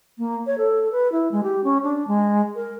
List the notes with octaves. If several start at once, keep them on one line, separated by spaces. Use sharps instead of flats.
A#3
C#5
A4
B4
E4
G#3
G4
C#4
D4
G#3
A#4